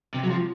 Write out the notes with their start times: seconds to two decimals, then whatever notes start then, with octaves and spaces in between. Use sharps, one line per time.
0.14 C3
0.23 F#3
0.30 F3